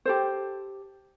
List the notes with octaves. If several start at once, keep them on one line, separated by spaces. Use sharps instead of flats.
G4 A4 C5